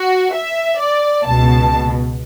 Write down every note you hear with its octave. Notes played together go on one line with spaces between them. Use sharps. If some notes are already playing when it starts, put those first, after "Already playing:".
Already playing: F#4
E5
D5
C#2 B2 A5